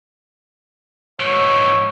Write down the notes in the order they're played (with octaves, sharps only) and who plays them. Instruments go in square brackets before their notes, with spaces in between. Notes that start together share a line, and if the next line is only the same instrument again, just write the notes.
[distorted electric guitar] G#2 E3 [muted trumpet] C#5